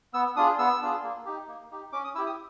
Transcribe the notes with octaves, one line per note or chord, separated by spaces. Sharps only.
B3 E6
D4 F4 G#4 D#6
B3 E6
D4 F4 G#4
A#3
D#4 G4
A#3
D#4 G4
C#4 D6
D#6
E4 G4 E6
D#6